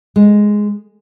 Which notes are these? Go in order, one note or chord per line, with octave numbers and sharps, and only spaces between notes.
G#3